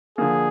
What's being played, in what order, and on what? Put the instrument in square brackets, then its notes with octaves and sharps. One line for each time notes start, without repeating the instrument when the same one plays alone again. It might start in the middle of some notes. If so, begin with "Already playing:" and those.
[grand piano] D3 F3 A#3 [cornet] G#4